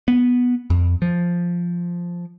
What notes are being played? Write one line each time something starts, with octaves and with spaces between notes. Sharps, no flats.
B3
F2
F3